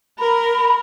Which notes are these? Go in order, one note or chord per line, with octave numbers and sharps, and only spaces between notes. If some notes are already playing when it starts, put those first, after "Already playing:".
A#4 B5